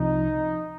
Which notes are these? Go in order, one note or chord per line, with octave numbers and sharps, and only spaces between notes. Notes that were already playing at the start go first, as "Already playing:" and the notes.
Already playing: C2 C3 F3 D#4